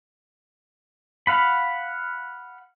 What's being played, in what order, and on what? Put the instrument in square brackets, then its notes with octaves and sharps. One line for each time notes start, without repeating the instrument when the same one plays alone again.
[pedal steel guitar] F5 F#5 B5